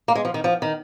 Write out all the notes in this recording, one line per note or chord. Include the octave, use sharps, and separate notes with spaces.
A#3
G#3
F3
D#3
F3
D#3